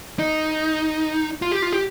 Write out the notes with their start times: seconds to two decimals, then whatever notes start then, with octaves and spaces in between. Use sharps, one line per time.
0.19 D#4
1.42 F4
1.52 G4
1.62 F4
1.72 G4